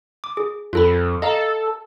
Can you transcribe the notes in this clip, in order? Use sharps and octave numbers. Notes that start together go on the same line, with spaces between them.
D6
G#4
F2 F4 A4 B5
A4 D#5 F5 A#5